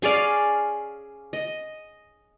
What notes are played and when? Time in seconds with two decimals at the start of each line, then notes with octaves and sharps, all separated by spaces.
0.02 C#4 G#4 D5 F5
1.33 D#5